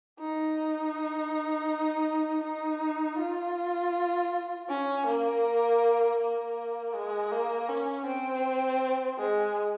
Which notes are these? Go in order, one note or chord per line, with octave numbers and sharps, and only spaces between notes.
D#4
D#4
F4
C#4
A#3
A#3
G#3
A#3
C#4
C4
G#3